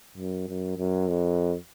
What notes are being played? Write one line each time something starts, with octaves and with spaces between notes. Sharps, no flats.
F#2
F#2
F#2
F2